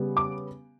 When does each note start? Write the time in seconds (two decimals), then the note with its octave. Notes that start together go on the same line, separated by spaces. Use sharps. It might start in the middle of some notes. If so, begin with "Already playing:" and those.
Already playing: C#3 G3 B3
0.17 D6